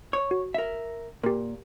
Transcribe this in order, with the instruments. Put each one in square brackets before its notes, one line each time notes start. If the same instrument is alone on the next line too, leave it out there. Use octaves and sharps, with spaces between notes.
[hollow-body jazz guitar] C#5
[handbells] F#4
[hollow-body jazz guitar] A#4 E5
[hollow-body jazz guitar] A#2 [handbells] G4 A#4